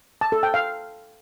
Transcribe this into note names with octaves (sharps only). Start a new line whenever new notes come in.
A5
A4
G5
F5